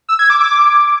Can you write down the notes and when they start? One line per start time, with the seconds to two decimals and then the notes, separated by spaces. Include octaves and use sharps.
0.09 E6
0.19 G#6
0.30 D6
0.40 D6